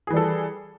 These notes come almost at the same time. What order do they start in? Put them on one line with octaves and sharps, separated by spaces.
G#4 E3 G3 A4